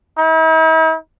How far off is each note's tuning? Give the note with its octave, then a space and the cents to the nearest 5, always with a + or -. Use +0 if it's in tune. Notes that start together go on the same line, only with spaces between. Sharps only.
E4 -45